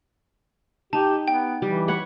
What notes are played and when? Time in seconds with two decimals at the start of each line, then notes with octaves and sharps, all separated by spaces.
0.93 D#4 G4 A5
1.28 B3 G5
1.62 E3 G3
1.88 C#5 F#5 B5